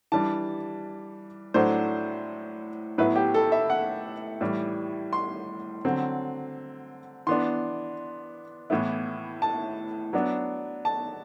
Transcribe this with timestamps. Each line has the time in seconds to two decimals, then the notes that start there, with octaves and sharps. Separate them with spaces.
0.12 E3 G3 D4 A5
1.54 A2 F#3 A3 D4 C5
2.98 A2 F#3 B3 E4 B4
3.16 G4
3.34 A4
3.52 E5
3.70 F#5
4.41 A2 E3 G3
5.13 C6
5.85 D3 F#3 C4
7.27 E3 B3 D4 C6
8.70 A2 E3 B3 E4
9.42 A5
10.13 F#3 B3 D4
10.85 A5